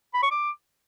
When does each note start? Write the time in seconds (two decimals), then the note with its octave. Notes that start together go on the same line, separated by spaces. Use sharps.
0.14 B5
0.23 C#6
0.31 D6